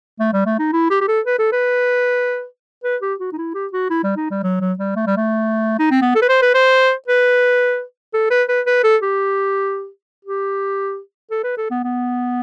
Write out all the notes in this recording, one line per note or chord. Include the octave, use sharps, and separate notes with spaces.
A3
G3
A3
D#4
E4
G4
G4
A4
B4
A4
B4
B4
G4
F#4
D#4
E4
G4
F#4
E4
G3
D#4
G3
F#3
F#3
G3
A3
G3
A3
D#4
C4
B3
A4
B4
C5
B4
C5
B4
A4
B4
B4
B4
A4
G4
G4
A4
B4
A4
B3
B3